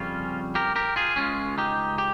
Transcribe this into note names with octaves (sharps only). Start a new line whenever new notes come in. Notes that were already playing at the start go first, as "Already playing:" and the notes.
Already playing: F2 C#3 G3 C4 C#4 F4
G4 A#4
G4 A#4
F4 G#4
C#2 C#3 G#3 C#4 F4
D#4 G4
G4